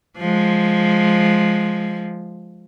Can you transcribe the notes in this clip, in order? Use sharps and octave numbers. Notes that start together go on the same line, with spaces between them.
F3 G#3